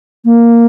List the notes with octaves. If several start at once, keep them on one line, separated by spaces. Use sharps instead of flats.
A#3